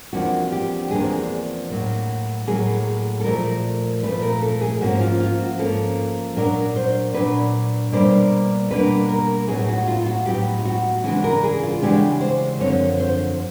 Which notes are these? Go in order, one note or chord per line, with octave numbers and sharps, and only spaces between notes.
E2 C3 F3 A#3 D4 F#4
G4
E2 C3 F3 A#3 D4 G#4
A2 F#3 A#3
A2 F#3 A#3 G#4
A4
A#2 F3 A3 A#4
A#2 F3 A3 B4
A#4
A4
G#4
G#2 F3 A#3 C#4 F#4
F4
F4
F#4
G#2 F3 A#3 C#4 A4
A#2 F#3 B3 D4 A#4
C5
A#2 F#3 B3 D4 B4
B2 G3 A#3 D4 C5
B2 G3 A#3 D4 B4
A#4
A2 F#3 B3 D#4 G#4
F#4
F4
F#4
A2 F#3 B3 D#4 G4
F4
F#4
C#3 E3 G#3 B3 D4 F#4
A#4
G#4
F4
C#3 E3 G#3 B3 D4 G4
C5
F#2 D3 F3 C4 C#5
C5